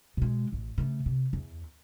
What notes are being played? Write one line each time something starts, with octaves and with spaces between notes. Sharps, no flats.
B2 G#3
A1
C#3 A3
C3
E2